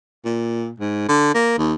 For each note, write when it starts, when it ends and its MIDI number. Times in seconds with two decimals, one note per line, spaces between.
0.25 0.71 46
0.80 1.04 44
1.08 1.33 50
1.34 1.56 58
1.58 1.74 39